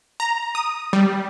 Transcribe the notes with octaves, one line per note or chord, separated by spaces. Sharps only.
A#5
D#6
G3